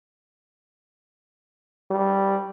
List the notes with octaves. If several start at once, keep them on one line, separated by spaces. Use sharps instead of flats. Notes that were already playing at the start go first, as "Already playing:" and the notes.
G3